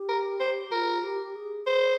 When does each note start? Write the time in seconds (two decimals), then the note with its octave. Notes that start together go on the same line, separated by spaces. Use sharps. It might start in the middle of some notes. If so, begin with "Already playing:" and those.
Already playing: G4
0.09 A#4
0.40 C5
0.72 F4 A#4
1.03 G4
1.35 G#4
1.66 G#4 C5